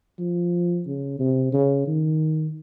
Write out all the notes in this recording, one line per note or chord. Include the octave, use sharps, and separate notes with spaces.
F3
C#3
C3
C#3
D#3